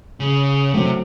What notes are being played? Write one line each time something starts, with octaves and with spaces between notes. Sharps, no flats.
C#3
C3 F#3 A3 C4